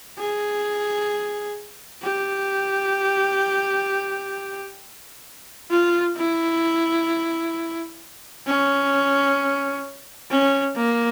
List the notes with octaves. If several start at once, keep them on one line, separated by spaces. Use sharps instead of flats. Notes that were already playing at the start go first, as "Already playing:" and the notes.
G#4
G4
F4
E4
C#4
C#4
A#3